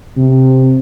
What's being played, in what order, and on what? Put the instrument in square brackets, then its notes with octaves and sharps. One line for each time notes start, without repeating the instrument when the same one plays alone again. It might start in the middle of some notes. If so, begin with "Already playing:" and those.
[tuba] C3